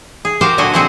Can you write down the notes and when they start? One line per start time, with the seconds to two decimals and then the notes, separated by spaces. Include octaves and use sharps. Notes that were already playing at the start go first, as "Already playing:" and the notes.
0.25 G#4
0.41 F#4 G4 A#4 C5 F5
0.58 A#2 D3 F#3 F#4 D#5 G#5
0.74 C4 F#4 G#4 C5 F#5